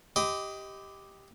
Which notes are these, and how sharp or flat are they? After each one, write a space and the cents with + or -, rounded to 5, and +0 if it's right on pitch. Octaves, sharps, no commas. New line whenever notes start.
G4 +0 D#5 +15 B5 +45